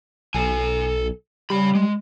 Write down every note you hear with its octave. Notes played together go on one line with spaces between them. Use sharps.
B1 A4 G#5
C#3 G3 B5
G#3